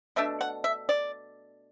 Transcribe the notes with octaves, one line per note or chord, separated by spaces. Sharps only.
B2 A3 D4 E5
F#5
E5
D5